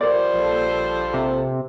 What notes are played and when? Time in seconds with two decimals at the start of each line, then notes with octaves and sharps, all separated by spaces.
0.01 F3 G3 A#4 C5 D5
0.34 A#1 A4
1.14 C3